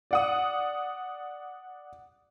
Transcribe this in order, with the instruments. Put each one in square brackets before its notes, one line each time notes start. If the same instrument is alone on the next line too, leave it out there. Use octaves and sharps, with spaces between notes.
[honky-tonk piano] D5 F#5 D#6